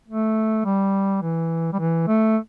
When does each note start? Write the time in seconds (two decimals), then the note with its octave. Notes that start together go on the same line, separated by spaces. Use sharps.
0.09 A3
0.65 G3
1.22 E3
1.73 G3
1.79 E3
2.07 A3